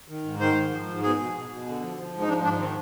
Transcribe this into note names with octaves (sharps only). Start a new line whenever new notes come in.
D#3
G#2
D#3 C5
G#2
F3
G#2
B2 G#4
B2
B2
B2
D3
F3
F3
G#2
D#4
F3 D4
G#2 D4
D#3 C4